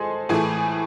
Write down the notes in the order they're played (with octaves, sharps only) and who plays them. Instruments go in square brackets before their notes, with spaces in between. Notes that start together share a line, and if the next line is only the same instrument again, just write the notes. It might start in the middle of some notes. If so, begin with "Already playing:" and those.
Already playing: [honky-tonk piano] G#3 G#4 A4 C5 G#5 C6
A2 E3 A3 G#4 G#5